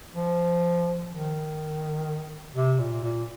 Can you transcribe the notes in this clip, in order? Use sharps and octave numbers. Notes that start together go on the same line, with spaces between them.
F3
D#3
C3
A#2
A#2